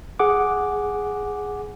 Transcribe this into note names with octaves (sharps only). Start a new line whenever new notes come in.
G#4 F#5 D6